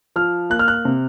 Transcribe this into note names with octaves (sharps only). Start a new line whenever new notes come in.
F3 F6
A#3 F#6
F6
F#6
C3